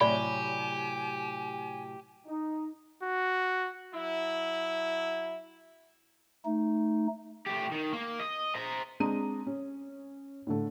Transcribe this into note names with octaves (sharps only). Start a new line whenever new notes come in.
A2 C3 F#3 G4 C#5 D5 G#5 B5
D#4
F#4
F#3 E4
A3 D#4
A2 G4
D#3
A#3
D#5
C5 A#5
G#3 C4 D4 A#5 D#6 D#7
C#4
A2 D3 A3